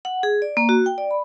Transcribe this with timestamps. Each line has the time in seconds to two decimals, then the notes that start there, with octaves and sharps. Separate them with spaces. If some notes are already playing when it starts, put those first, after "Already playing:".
0.05 F#5
0.23 G#4
0.42 D5
0.57 A#3
0.69 F#4
0.86 G5
0.98 D5
1.11 B5